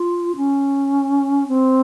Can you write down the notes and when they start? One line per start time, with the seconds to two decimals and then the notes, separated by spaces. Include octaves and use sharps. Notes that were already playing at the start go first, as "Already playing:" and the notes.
Already playing: F4
0.36 C#4
1.48 C4